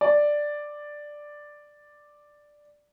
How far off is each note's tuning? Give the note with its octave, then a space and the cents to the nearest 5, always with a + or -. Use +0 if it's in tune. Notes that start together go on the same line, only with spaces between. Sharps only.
D5 +5